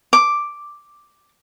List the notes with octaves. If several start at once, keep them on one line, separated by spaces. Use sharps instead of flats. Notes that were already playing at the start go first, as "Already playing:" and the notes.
D6